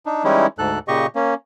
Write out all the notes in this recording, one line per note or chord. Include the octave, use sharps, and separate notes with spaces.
D4 D#4
E3 G3 G#3 C#4 D#4 E4
D2 G#2 A4 F#6
A#2 C#3 G4 D#5 C#6
A#3 C#4